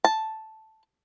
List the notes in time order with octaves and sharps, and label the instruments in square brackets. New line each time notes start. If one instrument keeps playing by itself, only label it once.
[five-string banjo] A5